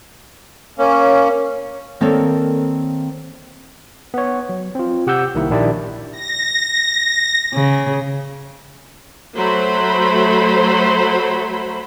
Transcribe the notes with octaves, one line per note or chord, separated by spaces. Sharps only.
A#3 C#4
D#3 A#3 C4 A4 C#5 D5
B3 C#5
F#3
C4 F4
C3 G4 F#5 D6 E6 G6
C2 D#3 A#3 E4
A#1 D#3 D4 E4 G4 D5
A#6
C#3
F#3 A3 C5 B5